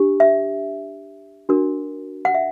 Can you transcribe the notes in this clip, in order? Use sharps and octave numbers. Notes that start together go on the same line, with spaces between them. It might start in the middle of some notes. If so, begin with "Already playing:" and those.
Already playing: D4 G4
E5
D4 F#4 A#4
F#5
E5